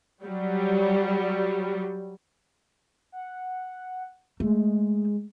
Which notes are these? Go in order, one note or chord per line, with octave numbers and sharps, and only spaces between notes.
F#3 G3
F#5
G#3 A3